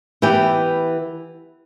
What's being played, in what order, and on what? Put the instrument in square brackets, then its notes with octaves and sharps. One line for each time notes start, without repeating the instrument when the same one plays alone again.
[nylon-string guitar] E3 B3 E4 G4